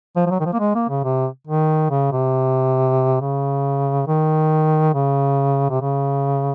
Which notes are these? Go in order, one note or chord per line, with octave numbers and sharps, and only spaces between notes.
F3
F3
F#3
D#3
F3
A#3
G#3
A#3
C#3
C3
D#3
C#3
C3
C#3
D#3
C#3
C3
C#3